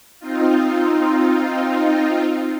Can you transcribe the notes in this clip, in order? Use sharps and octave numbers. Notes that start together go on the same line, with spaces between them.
C4 D#4 F4